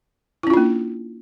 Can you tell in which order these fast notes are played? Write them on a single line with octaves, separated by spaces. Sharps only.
E4 C#4 F4 D4 A#3